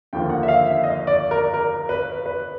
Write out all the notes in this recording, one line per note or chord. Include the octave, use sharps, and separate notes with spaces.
D#2 D3 F3 A#3 G5
F#5
E5
F5
E5
D#5
D5
A#4
A#4
B4
B4